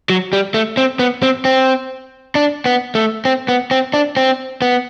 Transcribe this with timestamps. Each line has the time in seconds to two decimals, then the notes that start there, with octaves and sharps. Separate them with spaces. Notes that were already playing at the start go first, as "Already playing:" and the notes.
0.10 F#3
0.33 G3
0.54 A3
0.77 C4
0.99 B3
1.22 C4
1.45 C4
2.35 D4
2.66 B3
2.95 A3
3.25 C4
3.48 B3
3.71 C4
3.94 D4
4.17 C4
4.62 B3